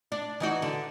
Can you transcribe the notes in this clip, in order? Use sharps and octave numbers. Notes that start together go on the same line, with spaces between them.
D4
E3 D#4 F#4
D3